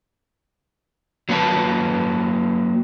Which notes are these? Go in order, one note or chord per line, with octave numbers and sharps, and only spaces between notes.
F#3 A#3 B4 D5 A5